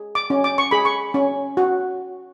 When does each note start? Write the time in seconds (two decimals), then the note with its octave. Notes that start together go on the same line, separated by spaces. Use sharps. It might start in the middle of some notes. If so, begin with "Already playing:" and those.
Already playing: G#4
0.15 D6
0.30 C#4
0.44 D6
0.58 C#6
0.71 G#4 B5
0.85 C#6
1.14 C#4
1.57 F#4